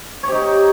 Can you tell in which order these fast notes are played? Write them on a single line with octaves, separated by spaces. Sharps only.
C#5 G4 D#4